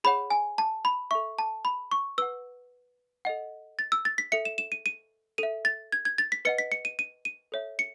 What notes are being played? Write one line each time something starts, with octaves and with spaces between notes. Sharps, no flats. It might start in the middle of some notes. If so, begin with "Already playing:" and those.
G#4 C#5 F#5 B5
G#5
A5
B5
A4 E5 C#6
A5
B5
C#6
B4 F#5 E6
A4 D#5 F#5
A6
E6
A6
B6
A4 E5 C#7
E7
E7
D#7
D#7
A4 E5 D#7
A6
G#6
G#6
A6
B6
B4 D#5 F#5 C#7
B6
C#7
D#7
D#7
D#7
A4 C#5 E5
C#7